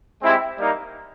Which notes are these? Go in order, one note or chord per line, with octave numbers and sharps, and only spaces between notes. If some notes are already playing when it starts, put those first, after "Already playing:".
G#3 C4 E4 G4
G3 A#3 D#4